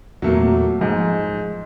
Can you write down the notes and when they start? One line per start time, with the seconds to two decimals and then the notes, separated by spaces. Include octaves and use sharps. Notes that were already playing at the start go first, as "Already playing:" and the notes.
0.22 E2 A#2 F#3 A3 A#3
0.81 G#2 F3